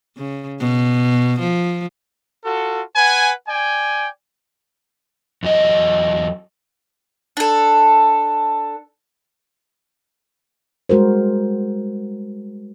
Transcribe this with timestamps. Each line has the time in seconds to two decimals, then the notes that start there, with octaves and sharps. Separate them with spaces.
0.17 C#3
0.60 B2
1.40 F3
2.45 F4 F#4 A4
2.96 B4 F#5 G#5
3.48 D5 G5 G#5
5.43 E2 F#3 D#5
7.37 D4 A4
10.89 G3 G#3 F#4 A#4 C5